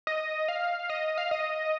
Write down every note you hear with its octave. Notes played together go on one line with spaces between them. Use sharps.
D#5
F5
D#5
F5
D#5